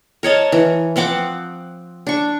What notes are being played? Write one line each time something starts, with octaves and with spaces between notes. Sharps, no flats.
A#4 C#5 D#5 A5
E3
F3 C4 F#5 D6
D4 C#6